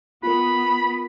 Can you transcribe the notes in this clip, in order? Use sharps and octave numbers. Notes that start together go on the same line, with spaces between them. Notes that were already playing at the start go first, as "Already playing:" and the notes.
B3 F4 A#4 B5